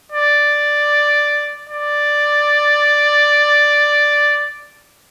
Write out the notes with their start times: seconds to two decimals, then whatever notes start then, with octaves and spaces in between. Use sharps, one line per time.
0.12 D5
1.69 D5